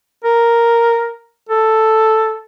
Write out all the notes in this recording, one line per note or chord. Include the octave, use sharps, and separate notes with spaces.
A#4
A4